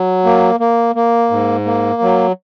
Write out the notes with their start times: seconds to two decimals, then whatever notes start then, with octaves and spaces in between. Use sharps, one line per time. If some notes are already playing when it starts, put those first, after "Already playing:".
Already playing: F#3
0.25 A#3
0.60 A#3
0.95 A#3
1.30 G#2
1.66 A#3
2.02 F#3